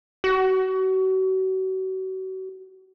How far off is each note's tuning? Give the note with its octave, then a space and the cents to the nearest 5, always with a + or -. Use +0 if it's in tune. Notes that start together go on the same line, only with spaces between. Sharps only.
F#4 +35